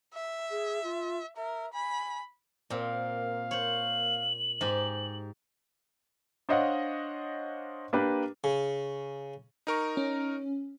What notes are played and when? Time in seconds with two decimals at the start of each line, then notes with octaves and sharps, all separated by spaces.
0.14 E5
0.51 G#4
0.84 F4
1.37 A#4 E5
1.74 G#5 B5
2.70 A#2 A#3 C4 F5
3.51 C5 C#5 F#7
4.61 G#2 G4
6.49 D4 C5 C#5 D#5 F5 F#5
7.93 A#3 D4 G4 B4
8.44 C#3
9.67 D#4 A#4 C#6
9.97 C#4